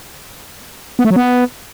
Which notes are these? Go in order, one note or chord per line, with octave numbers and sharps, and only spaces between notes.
B3
A3
F#3
B3